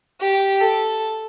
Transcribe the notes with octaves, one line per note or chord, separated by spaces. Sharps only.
G4
A4